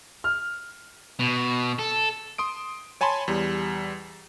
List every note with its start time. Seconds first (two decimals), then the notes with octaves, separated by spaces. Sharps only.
0.24 F6
1.19 B2
1.79 A4
2.38 C6 D#6 D7
3.01 C#5 G#5 A5 B5 C6
3.28 E2 G3